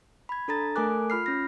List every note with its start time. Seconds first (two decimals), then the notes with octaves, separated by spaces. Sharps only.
0.29 B5 G#6
0.48 D4 A4 A#5 A6
0.76 A3 A4 A#4 G#5 D6 F#6
1.10 F4 B5 F6 C7
1.26 C#4 A#6